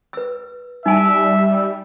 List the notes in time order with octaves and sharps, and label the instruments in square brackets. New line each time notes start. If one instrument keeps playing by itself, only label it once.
[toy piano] B4 E6
[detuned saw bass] G3 [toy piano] D#4 G#5 A5 [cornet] E5